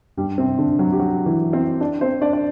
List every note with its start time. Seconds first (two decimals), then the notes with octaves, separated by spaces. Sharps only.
0.17 G2 G3
0.38 C3 C4
0.59 D3 D4
0.79 F#3 F#4
0.92 G4
0.99 F#3 F#4
1.26 E3 E4
1.53 C4 C5
1.81 D4 D5
2.01 C4 C5
2.21 D4 D5
2.33 D5